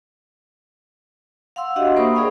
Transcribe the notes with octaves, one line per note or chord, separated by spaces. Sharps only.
F5 F#5 C6 E6
D4 F#4 G4 D#5 E5 F#5
A#3 A#4 C5 B5 C#6 D#6
G#4 D5 F5 G5